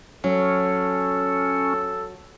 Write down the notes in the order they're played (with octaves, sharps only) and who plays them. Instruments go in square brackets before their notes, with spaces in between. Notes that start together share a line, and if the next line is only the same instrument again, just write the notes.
[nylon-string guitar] F#3 [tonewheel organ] C#4 [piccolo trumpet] A4